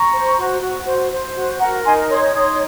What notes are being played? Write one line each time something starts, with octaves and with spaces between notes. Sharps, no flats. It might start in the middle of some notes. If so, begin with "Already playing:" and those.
Already playing: A#5 C#6
C5
F#4
F#4
C5
C5
F#4
A#4 F#5 A#5
D#4 G#5 C6
C#5 C6 D#6
D#4 C6 D#6